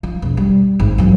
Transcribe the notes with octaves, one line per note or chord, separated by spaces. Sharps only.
F3
E1
G3
G#1
E3 F#3